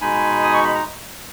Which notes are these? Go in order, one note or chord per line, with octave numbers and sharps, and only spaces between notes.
B2 G#3 D#4 G#5 B5
D#6
C#6
B5
A#5